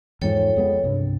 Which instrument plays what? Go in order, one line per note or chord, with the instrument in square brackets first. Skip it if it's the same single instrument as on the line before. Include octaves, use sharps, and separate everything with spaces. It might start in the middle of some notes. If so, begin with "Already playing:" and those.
[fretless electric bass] E2 G#2 F3 [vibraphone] A4 C#5 G5
[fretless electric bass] F2 G#3 B3
C2 G2